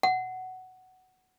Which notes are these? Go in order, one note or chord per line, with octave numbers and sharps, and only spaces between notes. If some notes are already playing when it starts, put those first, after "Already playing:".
F#5